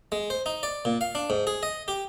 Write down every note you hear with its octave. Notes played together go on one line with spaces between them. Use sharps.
G#3
C5
D#4
D5
A#2
F5
D4
G#2
G#4
D#5
G4